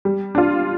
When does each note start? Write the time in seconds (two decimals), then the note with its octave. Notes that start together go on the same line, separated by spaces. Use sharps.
0.05 G3
0.35 D4 F4